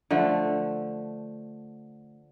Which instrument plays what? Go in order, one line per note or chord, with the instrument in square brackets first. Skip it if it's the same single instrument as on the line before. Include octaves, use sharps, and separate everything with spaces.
[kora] D3 F3 A3